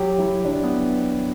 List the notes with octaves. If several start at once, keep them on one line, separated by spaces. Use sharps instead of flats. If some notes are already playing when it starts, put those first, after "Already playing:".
Already playing: F#3 G4
F#3 E4
F#3 D4
B3